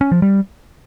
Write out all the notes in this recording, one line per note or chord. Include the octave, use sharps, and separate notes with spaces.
C#4
F3
G3